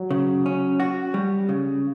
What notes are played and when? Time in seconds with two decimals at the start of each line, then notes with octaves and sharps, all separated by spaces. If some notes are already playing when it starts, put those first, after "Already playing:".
Already playing: F#3
0.11 C#3
0.46 C#4
0.80 F#4
1.14 G3
1.49 C#3